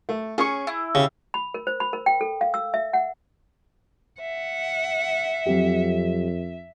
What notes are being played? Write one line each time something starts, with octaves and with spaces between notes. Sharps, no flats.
A3
C#4 G#4 C#6
E4
C#3 G4 F5
B5
A#4
C5
B5
A#4
G5
A4
F5
E6
E5
F#5
E5 F#5
F2 F#3 C4 G4